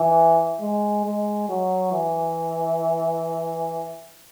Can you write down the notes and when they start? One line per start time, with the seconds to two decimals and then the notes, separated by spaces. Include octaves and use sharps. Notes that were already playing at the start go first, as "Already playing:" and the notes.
Already playing: E3
0.60 G#3
1.05 G#3
1.49 F#3
1.93 E3